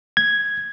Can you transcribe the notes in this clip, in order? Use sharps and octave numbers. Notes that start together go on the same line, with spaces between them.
G#6